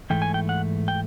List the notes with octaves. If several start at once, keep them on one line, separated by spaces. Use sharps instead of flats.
G#2 E3 A3 G5
G#5
G5
F#5
G5